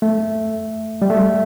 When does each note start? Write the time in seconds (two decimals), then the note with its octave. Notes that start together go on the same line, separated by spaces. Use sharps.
0.02 A3
1.02 G3
1.10 A3